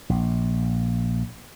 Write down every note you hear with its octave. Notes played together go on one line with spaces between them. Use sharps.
A#1